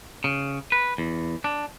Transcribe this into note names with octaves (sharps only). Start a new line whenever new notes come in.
C#3
B4
E2
D4